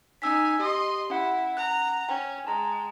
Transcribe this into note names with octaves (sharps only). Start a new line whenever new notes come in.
C#4 D#4 G#5 E6 B6
G4 D#5 C6
C#4 E4 F#5
A#5 F#6
C#4 G5
G#3 A5 A#5